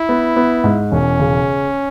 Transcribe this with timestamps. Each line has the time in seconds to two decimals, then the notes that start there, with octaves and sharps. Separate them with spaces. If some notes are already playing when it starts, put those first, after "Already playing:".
Already playing: E4
0.09 B3
0.36 B3
0.64 G#2
0.91 E1 C#4
1.19 C#3